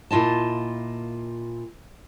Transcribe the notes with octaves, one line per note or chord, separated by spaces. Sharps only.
A#2 E4 F4 D#5 A5